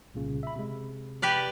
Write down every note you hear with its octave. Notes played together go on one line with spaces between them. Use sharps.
C2 A#2 C#3
E5 B5
C3 G#3
G4 B4 D5